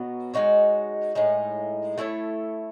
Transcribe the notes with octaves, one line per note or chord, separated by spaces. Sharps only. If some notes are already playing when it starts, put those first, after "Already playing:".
Already playing: B2 F#3 B3
G#3 D#4 F#4 C#5
A2 G#3 D#4
A3 E4 A4 C#5